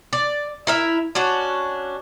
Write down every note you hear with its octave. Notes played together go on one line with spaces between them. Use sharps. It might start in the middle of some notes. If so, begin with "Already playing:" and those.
D5
E4 A#4 E5
C#4 D4 F#4